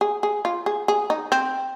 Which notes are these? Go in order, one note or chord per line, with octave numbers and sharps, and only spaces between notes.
G#4
G#4
F4
G#4
G#4
D#4
C4